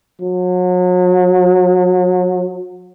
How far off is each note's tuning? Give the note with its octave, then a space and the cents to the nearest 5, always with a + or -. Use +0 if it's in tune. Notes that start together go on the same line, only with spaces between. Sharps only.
F#3 -35